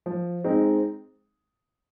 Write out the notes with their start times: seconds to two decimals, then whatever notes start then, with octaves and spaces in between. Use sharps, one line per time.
0.06 F3
0.44 G#3 C4 D#4